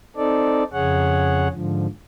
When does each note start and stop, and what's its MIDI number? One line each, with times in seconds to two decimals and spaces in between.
0.17 0.64 60
0.17 0.64 63
0.17 0.64 69
0.17 0.64 74
0.73 1.48 41
0.73 1.48 49
0.73 1.48 68
0.73 1.48 73
0.73 1.48 78
1.53 1.87 44
1.53 1.87 50
1.53 1.87 53